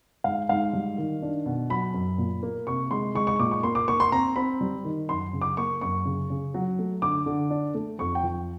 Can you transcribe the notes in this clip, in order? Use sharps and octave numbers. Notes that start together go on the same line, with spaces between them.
G#2 F5
G#2 F5
G3
D#3
D4
B2
F#3 B5
F#2
A#2
A#3
C3 C#6
G#3 C6
G#3 C#6
C#6
A#2 D6
C#6
A#3 C6
D6
A#3 C#6
C6
C4 A#5
C4 B5
G3
D#3
F#2 C6
C#3
D6
A#3 C#6
F#2 C#6
C#3
C#3
F#3
A3
D3 D6
D3
D4
A3
F2 C#6
G5
F3